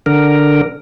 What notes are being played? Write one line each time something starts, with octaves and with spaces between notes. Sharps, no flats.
D3 A#4